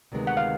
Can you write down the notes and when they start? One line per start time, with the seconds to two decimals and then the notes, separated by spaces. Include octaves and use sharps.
0.12 D2 C3 D#3 G#3 B3
0.27 F#5
0.37 F5